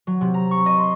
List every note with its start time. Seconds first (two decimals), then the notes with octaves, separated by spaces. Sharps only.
0.07 F#3
0.21 C3
0.34 A#5
0.51 C#6
0.66 D#5
0.78 C6